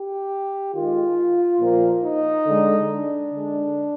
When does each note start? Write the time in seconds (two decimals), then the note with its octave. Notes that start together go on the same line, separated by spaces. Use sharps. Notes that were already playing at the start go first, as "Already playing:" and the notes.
Already playing: G4
0.74 D#3 G#3 F4
1.60 A#2 F3 A#3
2.03 D#4
2.45 D3 G#3
2.88 D4
3.31 D3 G#3